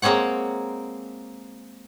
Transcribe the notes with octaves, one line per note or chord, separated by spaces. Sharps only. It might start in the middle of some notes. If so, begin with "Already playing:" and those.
G#3 A#3 C4 C#5 F#5